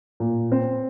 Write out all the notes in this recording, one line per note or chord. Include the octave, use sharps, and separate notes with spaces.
A#2
C4